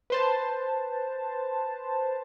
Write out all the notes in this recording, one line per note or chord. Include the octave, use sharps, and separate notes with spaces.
B4 C5 A5